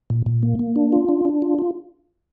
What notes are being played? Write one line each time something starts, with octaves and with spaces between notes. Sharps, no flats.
A#2
A#2
A#3
A#3
D4
F4
D4
D4
F4
F4